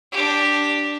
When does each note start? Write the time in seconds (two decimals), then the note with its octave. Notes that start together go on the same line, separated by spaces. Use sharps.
0.12 D4 G4